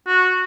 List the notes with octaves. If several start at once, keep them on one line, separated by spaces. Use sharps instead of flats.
F#4